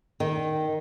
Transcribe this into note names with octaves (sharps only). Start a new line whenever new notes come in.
D#3